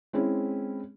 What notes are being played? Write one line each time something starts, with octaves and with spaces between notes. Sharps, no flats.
G#3 C4 C#4 E4